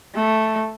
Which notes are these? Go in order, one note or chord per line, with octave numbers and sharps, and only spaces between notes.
A3